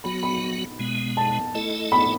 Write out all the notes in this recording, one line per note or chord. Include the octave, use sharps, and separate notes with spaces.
F#3 B3 F#4 B5
B5
B2 G#3 B3
A5
A3 E4 A4 D#5
B5